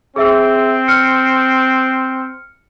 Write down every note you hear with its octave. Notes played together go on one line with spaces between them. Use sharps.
C4 G#4 E5 E6
F6 C#7